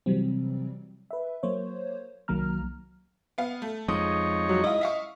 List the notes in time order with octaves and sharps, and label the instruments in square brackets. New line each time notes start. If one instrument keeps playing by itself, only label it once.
[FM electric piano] C3 E3 F#3 G3 C4
B4 E5
F#3 A#3 C5 C#5
C2 D#3 F#3 A#3 A#5 F6
[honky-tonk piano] B3 F5
A3
[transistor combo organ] F2 D#4 C#5 [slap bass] G#3 [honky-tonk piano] D#6
[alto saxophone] F#3 [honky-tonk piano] F#4
[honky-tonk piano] E4 F4 [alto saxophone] D#5
[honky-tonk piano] E5 F5 C#6